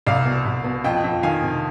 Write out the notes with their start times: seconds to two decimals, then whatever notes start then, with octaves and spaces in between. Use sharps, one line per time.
0.06 C2 D5 F5
0.26 B2
0.45 C2
0.64 B2
0.84 F2 D#5 G5
1.04 F2
1.23 D#3 F5 G#5
1.43 C3